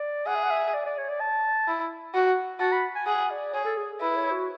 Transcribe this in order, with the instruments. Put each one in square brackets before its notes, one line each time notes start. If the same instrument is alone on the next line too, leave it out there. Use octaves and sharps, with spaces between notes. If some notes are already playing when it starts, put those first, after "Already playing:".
Already playing: [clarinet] D5
[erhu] G#4 [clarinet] F#5
[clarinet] E5
F#5
E5
D5
D5
C#5
D5
A5
[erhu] E4
F#4
[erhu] F#4 [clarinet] A5
[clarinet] B5
G#5
[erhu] G#4 [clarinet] F#5
[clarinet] D5
[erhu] G#4 [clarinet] C#5
[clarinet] A4
G#4
[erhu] E4 [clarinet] B4
[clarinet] C#5
F#4